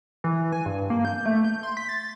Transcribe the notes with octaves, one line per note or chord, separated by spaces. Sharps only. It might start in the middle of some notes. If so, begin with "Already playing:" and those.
E3
G#5
G2
A#3
G6
A3
G6
C6
B6
A6